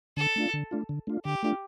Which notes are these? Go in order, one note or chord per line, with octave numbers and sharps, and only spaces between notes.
D3 A4
A3 D4 F4
D3
A3 D4 F4
D3
A3 D4 F4
D3 G4
A3 D4 F4